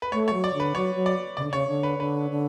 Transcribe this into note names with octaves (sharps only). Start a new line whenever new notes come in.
B4
A3 C#5
C#5
F#3
D5
D3
B4
F#3 C#5
F#3
D5
C#3 D5
D3
C#3 C#5
D3
B4
D3 B4
D3